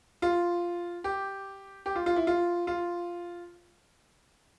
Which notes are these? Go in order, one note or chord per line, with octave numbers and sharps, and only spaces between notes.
F4
G4
G4
F4
F4
E4
F4
F4